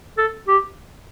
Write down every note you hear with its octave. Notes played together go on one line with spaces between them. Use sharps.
A4
G4